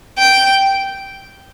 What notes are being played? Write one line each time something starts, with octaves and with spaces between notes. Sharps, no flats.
G5